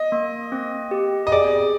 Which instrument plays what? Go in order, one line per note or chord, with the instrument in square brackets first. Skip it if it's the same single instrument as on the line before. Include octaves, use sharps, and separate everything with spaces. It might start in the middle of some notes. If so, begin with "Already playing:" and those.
Already playing: [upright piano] D#5
[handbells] A#3
C4
G4
[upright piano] D#5
[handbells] G#4 [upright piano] D5